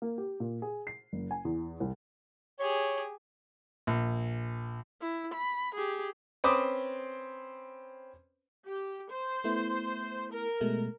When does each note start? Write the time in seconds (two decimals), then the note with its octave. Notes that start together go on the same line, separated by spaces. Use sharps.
0.02 A#3
0.18 G4
0.40 A#2
0.62 G#4
0.87 C7
1.13 F#1
1.31 G#5
1.45 E2
1.80 C2
2.60 G4 G#4 C#5
3.87 A#1
5.01 E4
5.34 B5
5.75 G4 G#4
6.44 C4 C#4 B4 C5 D6 D#6
8.66 G4
9.09 C5
9.44 A3 B3 E4
10.30 A#4
10.61 B2 G#3 A3